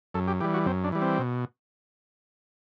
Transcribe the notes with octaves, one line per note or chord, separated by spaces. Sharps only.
F#2 A4
G4
E3 G3 G4
F#4
F#2 C4
D4
E3 G3
C4
B2